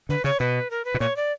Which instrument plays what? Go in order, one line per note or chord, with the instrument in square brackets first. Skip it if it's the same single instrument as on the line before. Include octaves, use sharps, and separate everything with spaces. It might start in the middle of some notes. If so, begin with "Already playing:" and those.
[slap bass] D3 [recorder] B4
[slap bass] C#3 [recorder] C#5
[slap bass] B2 [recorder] B4
[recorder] A#4
B4
[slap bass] B2
[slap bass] A#2 [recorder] C#5
[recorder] D5